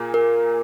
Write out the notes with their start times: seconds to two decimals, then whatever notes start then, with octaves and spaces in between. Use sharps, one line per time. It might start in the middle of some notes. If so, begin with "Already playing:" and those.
Already playing: A#2 A#3 G#4
0.14 A#4